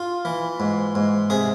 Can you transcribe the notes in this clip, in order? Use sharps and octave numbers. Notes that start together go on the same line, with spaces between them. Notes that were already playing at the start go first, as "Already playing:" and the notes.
Already playing: F4
E3
G#2
G#2
C3 G#4